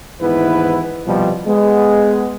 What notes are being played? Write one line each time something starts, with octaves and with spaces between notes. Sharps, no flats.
D#2 G#2 E3 B3 E4 B4
C2 B2 F3 G3
G#3 B3